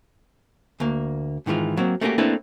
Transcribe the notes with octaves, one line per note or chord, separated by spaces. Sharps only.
D2 A#3
G#2 D#3 E3 G#3 F4
F#3 A#3 C4
A3 A#3 C#4 D4 F#4 G4
A3 A#3 C4 D4 E4 B4